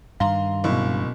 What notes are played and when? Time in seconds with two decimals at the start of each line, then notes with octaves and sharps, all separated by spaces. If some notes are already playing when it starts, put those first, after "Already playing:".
0.20 G2 D#3 F5 A#5 C6
0.64 F#1 B2 E4 C#6